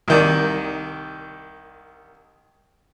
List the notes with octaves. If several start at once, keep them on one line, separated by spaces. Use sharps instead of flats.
C2 D#3 D5